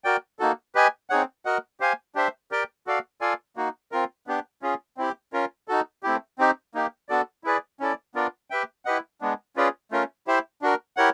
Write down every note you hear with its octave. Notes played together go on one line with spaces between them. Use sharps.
F#4 A#4 D5 G5
A#3 D#4 F#4 A4
G4 B4 D#5 G#5
C4 D#4 G#4 C#5 F#5
F#4 A#4 D#5 F#5
G4 C5 F5 G#5
D4 G4 C5 E5
G4 A#4 D5 G5
F#4 A4 D5 F5
F4 A4 D5 F5 G#5
A#3 D#4 F#4
C4 F4 A#4
B3 D4 G4
C#4 F4 G#4
C4 E4 G4
C#4 F4 A#4
D#4 F#4 A4
A3 C4 E4 G4
C4 D#4 G4
A#3 D#4 G4
B3 D4 F#4 A4 D5
E4 G#4 B4 D5
C#4 E4 A4 D5
B3 D4 F4 A#4 D5
G4 B4 E5 G5
E4 G4 B4 D#5 F#5
G#3 B3 D4
C#4 F4 G#4 B4 D5
A3 C#4 F4 A#4
E4 G4 C5 E5
D4 F#4 A#4
E4 G4 A#4 C#5 F#5